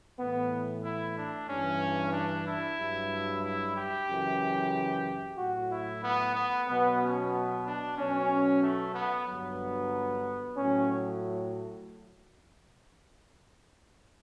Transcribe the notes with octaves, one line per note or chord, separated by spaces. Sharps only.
A2 E3 B3
E4
D4
G2 E3 C#4
D4
E4
G2 F#3
E4
G4
F#2 C#3 E3
A2 F#3 F#4
E4
B3
B3
B2 F#3 B3
C#4
B3
D4
B2 F#3 C#4
A3
B3
G2 D3 F#3 B3
A2 F#3 C#4